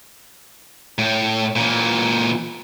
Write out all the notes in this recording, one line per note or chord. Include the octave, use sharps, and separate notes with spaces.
A2
A#2 E3